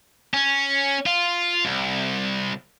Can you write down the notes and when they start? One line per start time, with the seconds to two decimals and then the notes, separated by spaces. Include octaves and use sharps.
0.34 C#4
1.06 F4
1.65 C2